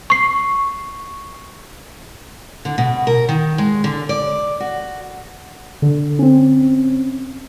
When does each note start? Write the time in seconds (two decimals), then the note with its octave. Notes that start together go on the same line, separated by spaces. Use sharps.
0.10 C#6 C7
2.65 D3
2.78 B2
3.07 A#4
3.29 D#3
3.58 G#3
3.84 D3
4.09 D5
4.60 F#4
5.82 D3
6.19 C4 C#4